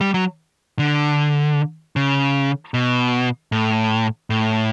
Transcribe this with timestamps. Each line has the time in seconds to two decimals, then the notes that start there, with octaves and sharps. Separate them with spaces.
0.01 G3
0.14 F#3
0.79 D3
1.96 C#3
2.74 B2
3.52 A2
4.30 A2